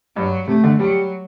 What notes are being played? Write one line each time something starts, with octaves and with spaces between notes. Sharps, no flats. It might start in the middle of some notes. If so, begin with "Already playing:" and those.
G2 F#3
C3 A3
D3
F#3 G3